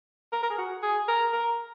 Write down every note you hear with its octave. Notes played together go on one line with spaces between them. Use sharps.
A#4
A#4
G#4
F#4
G#4
A#4
A#4